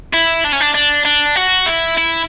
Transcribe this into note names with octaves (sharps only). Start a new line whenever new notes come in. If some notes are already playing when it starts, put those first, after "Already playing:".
E4
D4
C#4
D4
D4
D4
F#4
E4
E4